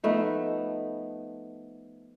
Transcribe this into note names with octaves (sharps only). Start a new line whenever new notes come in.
F3 A3 B3 D#4